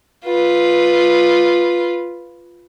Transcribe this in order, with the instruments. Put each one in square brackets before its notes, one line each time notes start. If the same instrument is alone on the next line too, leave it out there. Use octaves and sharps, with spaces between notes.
[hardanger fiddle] F4 B4